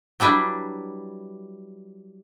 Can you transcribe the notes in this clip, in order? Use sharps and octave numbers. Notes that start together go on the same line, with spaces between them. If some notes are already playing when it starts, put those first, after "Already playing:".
F#3 G3 D4 E4 B4